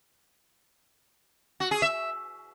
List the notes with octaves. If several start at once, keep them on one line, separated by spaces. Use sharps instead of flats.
F#4
G#4
E5